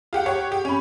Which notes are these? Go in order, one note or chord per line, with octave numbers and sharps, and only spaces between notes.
F4 G4 F#5
G4 C#5 F#5
G4
C#4 B5